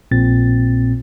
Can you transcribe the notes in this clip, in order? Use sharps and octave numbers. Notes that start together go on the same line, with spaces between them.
A#1 A#2 C4 A6